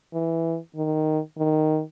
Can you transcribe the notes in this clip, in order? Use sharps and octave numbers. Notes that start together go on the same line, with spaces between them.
E3
D#3
D#3